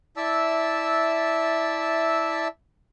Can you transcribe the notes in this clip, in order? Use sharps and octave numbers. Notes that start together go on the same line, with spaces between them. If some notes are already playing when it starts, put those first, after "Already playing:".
E4 D5 E5 A5 E6